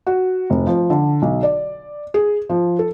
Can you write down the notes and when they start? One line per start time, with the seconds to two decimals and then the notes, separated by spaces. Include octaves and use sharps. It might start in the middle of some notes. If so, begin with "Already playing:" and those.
0.07 F#4
0.50 F1
0.67 F3
0.90 D3
1.22 B1
1.43 D5
2.14 G#4
2.49 F3
2.79 A4